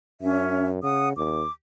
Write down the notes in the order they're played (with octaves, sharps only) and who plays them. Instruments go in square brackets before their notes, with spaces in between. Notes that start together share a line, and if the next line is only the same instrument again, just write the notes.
[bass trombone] F#2 [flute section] C#4 D4 E5
[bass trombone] C#3 [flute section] F#5 D#6
[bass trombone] D#2 [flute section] D6